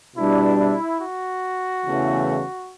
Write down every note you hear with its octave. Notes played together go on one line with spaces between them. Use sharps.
B2 G3 D4 E4
E4
F#4
E2 C#3 E3 A3